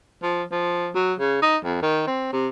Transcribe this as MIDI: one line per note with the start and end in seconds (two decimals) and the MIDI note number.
0.22 0.43 53
0.51 0.90 53
0.95 1.14 54
1.19 1.37 49
1.42 1.56 63
1.64 1.80 41
1.82 2.03 51
2.07 2.31 60
2.33 2.48 48